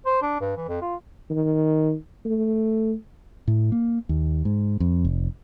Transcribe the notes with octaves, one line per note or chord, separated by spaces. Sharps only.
C5
D4
G2
E3
F2
F4
D#3
A3
A2
A#3
D#2
G#2
F2
F1